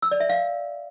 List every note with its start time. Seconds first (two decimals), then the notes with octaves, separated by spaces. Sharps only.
0.02 E6
0.11 D5
0.20 E5
0.29 F5